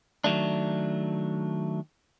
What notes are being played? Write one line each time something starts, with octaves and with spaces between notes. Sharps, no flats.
D#3 F#3 A3 D4